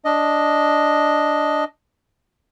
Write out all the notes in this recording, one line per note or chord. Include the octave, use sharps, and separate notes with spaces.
D4 D#5